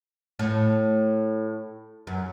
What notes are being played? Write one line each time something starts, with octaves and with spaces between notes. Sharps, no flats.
A2
F#2